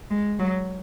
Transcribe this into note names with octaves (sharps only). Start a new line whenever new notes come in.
G#3
F#3